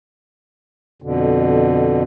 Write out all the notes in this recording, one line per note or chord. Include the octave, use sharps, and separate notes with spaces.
F2 B2 D3